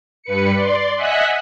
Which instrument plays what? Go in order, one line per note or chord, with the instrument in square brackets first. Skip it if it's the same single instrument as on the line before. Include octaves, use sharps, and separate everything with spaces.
[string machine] G2 B4 C#7
D5 C6
D#5 E5 F#5 G#5 F#6 B6